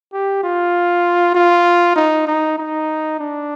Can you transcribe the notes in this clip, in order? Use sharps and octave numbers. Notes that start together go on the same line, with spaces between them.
G4
F4
F4
D#4
D#4
D#4
D4